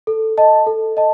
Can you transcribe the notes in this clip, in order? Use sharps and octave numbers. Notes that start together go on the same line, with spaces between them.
A4
D#5 A5
A4
D#5 A5